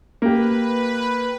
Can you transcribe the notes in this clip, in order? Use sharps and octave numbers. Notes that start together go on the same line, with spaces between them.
A#3 G4 B4